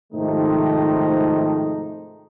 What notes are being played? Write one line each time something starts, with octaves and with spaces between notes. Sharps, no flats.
G#2 C3 D#3 F3 A3 D#4